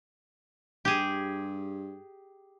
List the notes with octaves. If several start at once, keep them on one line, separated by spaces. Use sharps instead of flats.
G2 G4 G#4